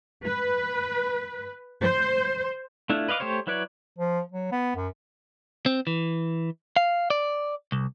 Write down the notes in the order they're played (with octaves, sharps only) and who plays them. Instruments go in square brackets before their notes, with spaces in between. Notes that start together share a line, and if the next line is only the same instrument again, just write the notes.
[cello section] B4
C5
[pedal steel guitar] A3 D4 E4 F4
B4 D#5 F5 D6
A3 G4 C5 C#5
F#3 E4 B4 C#5 D5
[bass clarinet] F3
F#3
B3
F#2
[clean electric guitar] C4
E3
F5
D5
C2